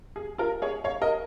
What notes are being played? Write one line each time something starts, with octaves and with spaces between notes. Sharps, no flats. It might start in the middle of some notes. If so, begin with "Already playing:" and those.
G#4
F4 A#4
G#4 C#5
C#5 F5
A#4 D#5